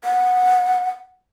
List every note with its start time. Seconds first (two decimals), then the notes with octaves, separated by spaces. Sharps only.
0.04 F#5